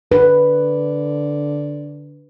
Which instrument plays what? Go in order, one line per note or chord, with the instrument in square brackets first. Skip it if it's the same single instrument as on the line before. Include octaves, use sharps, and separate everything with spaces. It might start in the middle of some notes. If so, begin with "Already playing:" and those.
[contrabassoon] D3 [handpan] B4